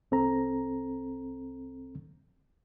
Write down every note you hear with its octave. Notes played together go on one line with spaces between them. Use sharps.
C2 C4 A4 A#5